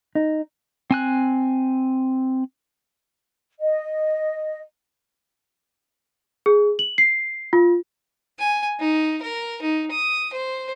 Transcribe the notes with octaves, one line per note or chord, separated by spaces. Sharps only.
D#4
C4 G#5 F#6
D#5
G#4
F#7
C7
F4
G#5
D#4
A#4
D#4
D#6
C5